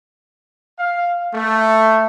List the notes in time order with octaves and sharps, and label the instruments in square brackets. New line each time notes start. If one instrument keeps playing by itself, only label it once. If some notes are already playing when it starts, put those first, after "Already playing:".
[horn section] F5
A3